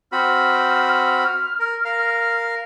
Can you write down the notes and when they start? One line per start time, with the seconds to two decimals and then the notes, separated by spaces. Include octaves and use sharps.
0.12 C4 F#4 B5 F6
1.59 A#4
1.85 A#4 F5